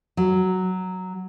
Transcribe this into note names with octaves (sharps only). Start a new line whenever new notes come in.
F#3